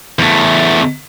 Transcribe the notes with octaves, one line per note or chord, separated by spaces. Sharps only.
E2 A3